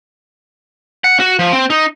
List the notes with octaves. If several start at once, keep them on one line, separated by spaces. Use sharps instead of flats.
F#5
F#4
F3
C4
D#4